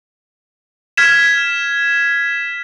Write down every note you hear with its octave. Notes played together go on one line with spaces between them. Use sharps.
F6 G#6 B6 E7